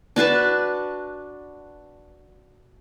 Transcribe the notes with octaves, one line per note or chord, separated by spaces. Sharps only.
D4 F#4 B4 A5